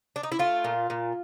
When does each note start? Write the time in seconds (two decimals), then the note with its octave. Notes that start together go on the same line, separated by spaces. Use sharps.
0.16 D4
0.23 D#4
0.32 E4
0.39 A3 F4
0.64 A#2
0.90 A#2